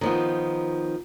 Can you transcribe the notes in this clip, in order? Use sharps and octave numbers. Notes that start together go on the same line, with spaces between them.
D#3 F3 B3